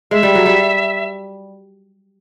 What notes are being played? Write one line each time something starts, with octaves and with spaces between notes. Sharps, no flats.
G#3 E5
G3
F#3
G3